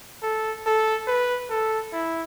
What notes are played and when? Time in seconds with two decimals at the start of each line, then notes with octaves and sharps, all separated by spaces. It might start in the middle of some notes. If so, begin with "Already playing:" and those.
0.23 A4
0.66 A4
1.07 B4
1.50 A4
1.93 E4